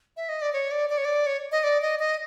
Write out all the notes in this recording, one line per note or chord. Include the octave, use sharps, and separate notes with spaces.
E5
D#5
D5
C#5
D5
D5
C#5
D5
C#5
D#5
D5
D#5
D#5